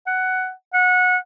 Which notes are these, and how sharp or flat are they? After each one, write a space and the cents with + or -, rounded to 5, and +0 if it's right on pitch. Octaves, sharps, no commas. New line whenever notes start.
F#5 +10
F#5 -20